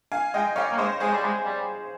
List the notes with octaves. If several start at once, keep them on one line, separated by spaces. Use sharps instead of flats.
F5 G#5
G#3 D#5 G5
G3 C#5 F5
A#3
G#3 C5 D#5
G#3 G#4 C5
G3
G#3
G3